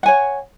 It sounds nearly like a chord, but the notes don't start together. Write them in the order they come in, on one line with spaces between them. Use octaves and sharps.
F#5 G#5 C#5